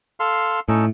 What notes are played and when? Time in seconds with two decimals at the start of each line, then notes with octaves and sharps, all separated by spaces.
0.20 A4 F5 C6
0.69 A2 C#4 D#4 A4